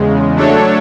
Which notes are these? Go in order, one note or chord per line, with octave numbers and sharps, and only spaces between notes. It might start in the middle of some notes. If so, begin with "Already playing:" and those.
Already playing: E2 C#3 G#3
F#3 A3 D4 A4 C#5